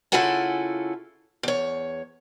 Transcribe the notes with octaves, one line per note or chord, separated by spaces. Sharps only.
C#3 E4 F4 A4 F#5 G#5
E2 C#5